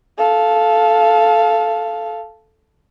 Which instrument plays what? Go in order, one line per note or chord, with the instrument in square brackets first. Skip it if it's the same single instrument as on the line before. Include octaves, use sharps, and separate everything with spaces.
[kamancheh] A4 F5